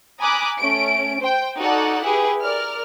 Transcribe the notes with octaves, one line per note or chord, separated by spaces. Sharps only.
G#5 A#5 B5 D6 D#6 F#6
A3 C#4 D7
C5 G5
D#4 F#4 A4 D5 F#5
E4 G4 G#4 B4
A#4 D5 F6